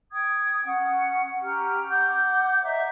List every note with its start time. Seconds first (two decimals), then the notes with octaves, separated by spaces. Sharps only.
0.13 G5 D#6 G#6
0.65 C#4 F#5
1.43 C#4 G4 A#5 F6
1.88 F#5 D6 G6
2.64 C#5 D#5 E5 A#5